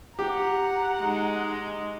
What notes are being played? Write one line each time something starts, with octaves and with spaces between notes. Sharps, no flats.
G4 F#5 A#5
G#3 D#4